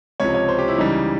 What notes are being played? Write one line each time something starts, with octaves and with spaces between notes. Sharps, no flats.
C#2 C3 F3 C#5
C#5
C5
G4
E4
C#2 C#3 E3 G3 D#4